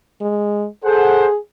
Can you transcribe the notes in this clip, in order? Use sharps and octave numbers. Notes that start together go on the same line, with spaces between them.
G#3
G#4 A4 C5 F#5